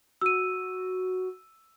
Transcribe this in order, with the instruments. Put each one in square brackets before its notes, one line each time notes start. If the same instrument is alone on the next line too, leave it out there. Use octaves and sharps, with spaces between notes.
[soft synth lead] F#4 [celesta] E6 D#7